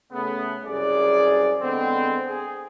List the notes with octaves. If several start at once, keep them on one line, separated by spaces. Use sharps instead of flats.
C#3 A3 B3
C2 F#2 C#3 G#4 D5
D3 G#3 B3 C4
G#4